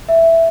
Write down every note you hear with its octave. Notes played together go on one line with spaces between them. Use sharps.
E5